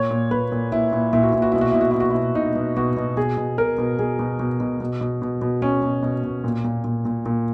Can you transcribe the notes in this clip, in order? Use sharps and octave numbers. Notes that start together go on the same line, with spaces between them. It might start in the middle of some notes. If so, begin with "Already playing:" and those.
Already playing: A#2 C#5
A#2
A#2 B4
A#2
A#2 E4
A#2
A#2 E4
F#4
A#2 E4
F#4
B2 E4
F#4
B2 E4
F#4
B2 E4
F#4
E4
B2
B2 D#4
B2
B2 F#4
B2
B2 G#4
B2
B2 A#4
B2
B2 G#4
B2
B2
B2
B2
B2
B2
B2
B2 C#4
B2
B2
B2
A#2
A#2
A#2
A#2
A#2